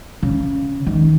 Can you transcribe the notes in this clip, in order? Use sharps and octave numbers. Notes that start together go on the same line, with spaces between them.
C#3
D#3